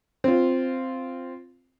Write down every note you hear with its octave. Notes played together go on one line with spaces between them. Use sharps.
C4 F4